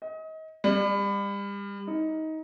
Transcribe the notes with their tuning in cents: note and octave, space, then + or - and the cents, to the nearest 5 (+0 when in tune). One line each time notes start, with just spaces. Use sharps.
D#5 +30
G3 +35
D#4 +20